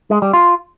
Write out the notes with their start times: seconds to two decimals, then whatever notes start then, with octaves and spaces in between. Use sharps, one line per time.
0.11 G#3
0.22 G3
0.33 F4